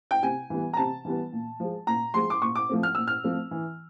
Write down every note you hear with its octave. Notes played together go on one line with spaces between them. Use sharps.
G5
C3 G#5
E3 G3 B3
A#5
C3 A5
E3 G3 B3
A#2
F3 G#3
A#2 A#5
F3 G#3 C6
D6
A#2 C#6
D6
F3 A3 C4
F6
A#2 E6
F6
F3 A3 C4
E3